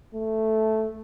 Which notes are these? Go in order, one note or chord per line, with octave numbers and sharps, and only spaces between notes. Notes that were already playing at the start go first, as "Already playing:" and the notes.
A3